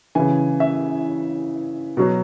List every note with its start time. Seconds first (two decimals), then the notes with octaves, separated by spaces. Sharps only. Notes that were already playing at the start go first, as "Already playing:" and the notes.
0.15 C#3 E3 G#5
0.60 E5
1.97 B2 F#3